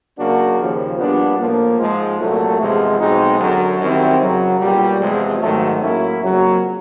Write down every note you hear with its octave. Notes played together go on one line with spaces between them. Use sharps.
C#3 F#3 A#3 D4 F#4
D#2 C#3 F3
A#2 G3 B3 D4
A2 F3 A#3
G#2 F3 G#3
C2 A#2 F#3 A3
E2 C3 F3 G#3
B1 B2 G#3 C4 D#4
F#2 D3 F#3
F#2 D#3 G3 C4 E4
F#2 C#3 F#3
B1 A#2 G3
E2 C3 F3 G#3
G#2 D#3 F#3 A3
A2 F#3 A#3 C#4 E4
F2 C#3 F#3 A#3